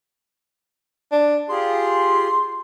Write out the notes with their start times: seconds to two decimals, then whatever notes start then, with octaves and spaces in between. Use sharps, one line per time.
1.12 D4
1.49 F4 G4 G#4 C6